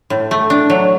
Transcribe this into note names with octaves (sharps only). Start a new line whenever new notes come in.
A2
A3
D4
F#3